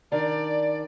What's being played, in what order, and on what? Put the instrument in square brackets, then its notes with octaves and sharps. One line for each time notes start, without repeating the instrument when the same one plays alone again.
[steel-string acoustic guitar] D#3 D4 [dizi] D5